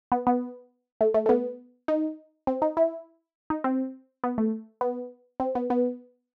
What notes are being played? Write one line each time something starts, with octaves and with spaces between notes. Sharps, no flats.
B3
B3
A3
A3
A3
B3
D#4
C4
D#4
E4
D#4
C4
B3
A3
B3
C4
B3
B3